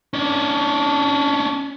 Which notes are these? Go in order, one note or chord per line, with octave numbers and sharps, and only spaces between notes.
C#4 D4